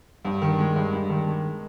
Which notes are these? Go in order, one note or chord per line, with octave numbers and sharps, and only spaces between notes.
G2
D#3
G#3
G2
G2
D#3
G#3